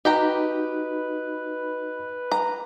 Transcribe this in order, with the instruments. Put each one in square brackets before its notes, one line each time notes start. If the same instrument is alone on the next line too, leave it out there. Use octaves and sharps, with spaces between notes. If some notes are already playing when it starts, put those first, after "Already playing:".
[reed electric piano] D#4 F#4 [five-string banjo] G4 G5 A#5 [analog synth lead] B4 [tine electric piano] D#5
[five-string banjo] A#5